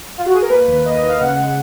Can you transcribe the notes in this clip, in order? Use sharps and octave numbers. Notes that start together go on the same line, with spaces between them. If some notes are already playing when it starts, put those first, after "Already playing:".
F4
F#4
G#4
A#4
A#3 B4
D#2
A#3 D#5
D#5
D#3
F5
C#3 F#5
G#3